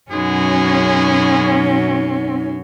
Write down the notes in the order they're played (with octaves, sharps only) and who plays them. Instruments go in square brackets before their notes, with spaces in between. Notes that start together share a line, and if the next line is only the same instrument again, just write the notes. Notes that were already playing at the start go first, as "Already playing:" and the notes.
[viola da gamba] F#2 B2 F#3 [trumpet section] G#3 B3 G#4 [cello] C#4 [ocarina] D#4